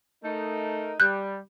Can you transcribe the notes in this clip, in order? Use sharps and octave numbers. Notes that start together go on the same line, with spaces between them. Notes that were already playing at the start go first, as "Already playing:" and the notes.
A3 D#4 A#4
G3 F#6 G6